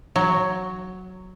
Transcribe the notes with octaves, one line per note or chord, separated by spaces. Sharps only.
F#3